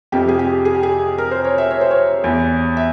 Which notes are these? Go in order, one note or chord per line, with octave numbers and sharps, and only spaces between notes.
F2 C3 F3 G4
G#4
G4
G#4
G4
G#4
A#4
C5
C#5
E5
C#5
C5
C#5
E2 E3
E5